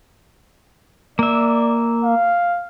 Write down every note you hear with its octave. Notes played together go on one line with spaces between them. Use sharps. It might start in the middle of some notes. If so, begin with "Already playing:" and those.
A#3 D5 E5
F5